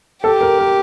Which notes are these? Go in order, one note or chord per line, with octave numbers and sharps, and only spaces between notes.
G4 A4
A#4
A#4